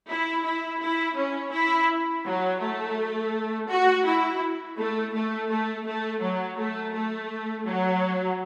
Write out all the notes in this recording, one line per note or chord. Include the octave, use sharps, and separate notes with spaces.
E4
E4
E4
C#4
E4
F#3
A3
F#4
E4
A3
A3
A3
A3
F#3
A3
A3
F#3